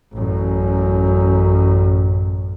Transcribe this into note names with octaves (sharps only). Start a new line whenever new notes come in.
A1 F#2